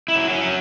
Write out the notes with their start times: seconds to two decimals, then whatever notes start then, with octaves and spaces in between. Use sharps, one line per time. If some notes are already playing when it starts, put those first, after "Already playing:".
0.08 E4
0.15 F#3
0.30 C#4
0.43 F#3